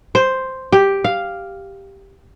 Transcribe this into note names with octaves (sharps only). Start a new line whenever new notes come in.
C5
G4
F5